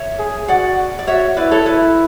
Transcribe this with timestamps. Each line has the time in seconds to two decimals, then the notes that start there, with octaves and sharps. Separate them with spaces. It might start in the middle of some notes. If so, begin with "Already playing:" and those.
Already playing: C#5 E5
0.19 G#4
0.48 F#4 D5 F#5
0.99 D5
1.07 F#4 C#5 E5
1.37 E4 B4 D5
1.51 A4 C#5
1.66 E4 B4